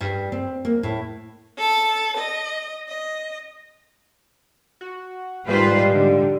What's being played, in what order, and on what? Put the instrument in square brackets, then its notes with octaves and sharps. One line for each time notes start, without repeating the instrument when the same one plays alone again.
[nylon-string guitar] G2
C4
A#3
A2
[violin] A4 A6
D#5
D#5
[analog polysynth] F#4
[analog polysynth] G#2 D#3 F3 [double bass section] G3 [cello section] F4 B4 C5
[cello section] D3